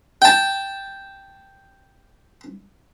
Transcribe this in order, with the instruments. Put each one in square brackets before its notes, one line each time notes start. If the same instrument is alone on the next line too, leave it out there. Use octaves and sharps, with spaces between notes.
[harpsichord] G5 A5